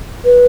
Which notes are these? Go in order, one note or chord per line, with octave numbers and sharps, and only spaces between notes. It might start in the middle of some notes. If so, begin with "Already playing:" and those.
B4